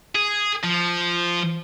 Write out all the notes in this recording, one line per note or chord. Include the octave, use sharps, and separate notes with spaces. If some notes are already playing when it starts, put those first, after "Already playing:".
G#4
F3